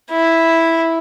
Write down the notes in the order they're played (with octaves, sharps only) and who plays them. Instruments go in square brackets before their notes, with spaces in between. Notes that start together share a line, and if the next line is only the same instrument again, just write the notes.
[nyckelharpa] E4